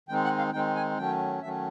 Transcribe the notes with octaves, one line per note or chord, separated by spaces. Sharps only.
D#3 G#3 C4 D#4 G5
F#5
F5
D#3 G#3 C4 D#4 G5
G#5
D#3 F#3 A3 C#4 G5
D#3 F#3 A3 C#4 E5